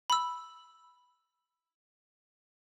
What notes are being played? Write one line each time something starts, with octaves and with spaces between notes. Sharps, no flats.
B5 E6